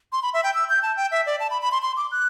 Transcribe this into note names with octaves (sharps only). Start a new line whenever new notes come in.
C6
B5
E5
G5
E6
G6
A5
G5
E5
D5
A5
B5
B5
C6
C6
D6
F#6